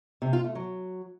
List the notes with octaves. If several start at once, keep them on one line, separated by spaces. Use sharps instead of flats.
C3
F4
A3
F#3